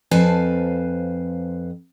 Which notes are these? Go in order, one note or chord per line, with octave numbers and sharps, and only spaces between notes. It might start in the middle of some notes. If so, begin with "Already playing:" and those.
F2 C4 B4 F5 G#5 A5